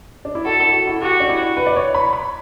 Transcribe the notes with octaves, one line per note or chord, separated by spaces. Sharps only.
D4
E4
F#4 A4
E4
F#4
E4
F#4 G4
D4
E4
B4
D5
C#5
B5
B5